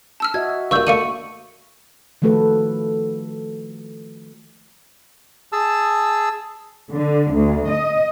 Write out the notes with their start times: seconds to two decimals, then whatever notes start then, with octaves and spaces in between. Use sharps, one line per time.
0.20 A5 E6 F6
0.34 F#4 D#5 E5 G#6
0.71 G2 A#2 C#6 E6 G6
0.87 A3 A#3 D4 C#6 C#7 D#7
2.22 D#3 F3 A3 F#4 A4 B4
5.52 G#4 A5 E6
6.91 D3
7.33 D2
7.69 D#5